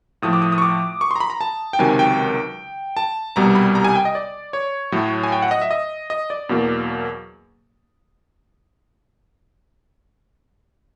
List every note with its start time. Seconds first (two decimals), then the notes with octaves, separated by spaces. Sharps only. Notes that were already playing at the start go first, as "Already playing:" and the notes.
0.22 A2 F3 A3 D#6
0.33 D6
0.42 D#6
0.52 D#6
0.58 C#6
0.62 D6
1.01 C#6
1.11 A#5 C6
1.20 B5
1.30 A#5
1.41 A5
1.73 G5
1.79 C#2 C3 D#3 F#3 G#5
1.99 G5
2.97 A5
3.36 C2 B2 G3 B3 A#5
3.55 B5
3.75 A#5
3.84 G#5
3.95 G5
4.05 D#5
4.15 D5
4.53 C#5
4.92 A2 F#3 A3
5.23 G#5
5.32 G5
5.42 F#5
5.51 D#5
5.62 E5
5.71 D#5
6.10 D#5
6.30 D5
6.49 E2 B2 F#3 A#3